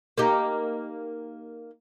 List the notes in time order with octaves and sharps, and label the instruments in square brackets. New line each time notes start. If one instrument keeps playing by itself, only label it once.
[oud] A#3 D#4 G4